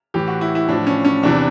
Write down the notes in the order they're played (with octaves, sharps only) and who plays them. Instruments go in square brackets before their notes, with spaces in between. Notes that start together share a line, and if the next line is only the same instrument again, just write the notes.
[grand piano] A2 E3 G4
F#4
E4
E4
A2 F3 D4
C#4
C#4
E2 C3 E3 D4